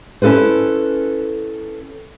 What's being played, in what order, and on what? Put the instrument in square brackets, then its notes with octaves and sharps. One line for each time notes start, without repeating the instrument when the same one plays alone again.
[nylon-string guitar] C#4 E4 A4 B4 C5